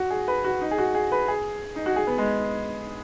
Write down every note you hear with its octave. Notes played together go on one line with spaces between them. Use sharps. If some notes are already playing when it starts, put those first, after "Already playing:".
Already playing: F#4
G#4
B4
F#4
D#4
G#4
F#4
G#4
B4
G#4
D#4
F#4
G#4
B3
G#3